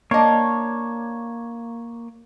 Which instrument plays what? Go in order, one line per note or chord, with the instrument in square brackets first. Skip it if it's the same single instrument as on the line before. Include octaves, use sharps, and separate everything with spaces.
[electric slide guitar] A#3 C#5 [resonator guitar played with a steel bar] D4 D#5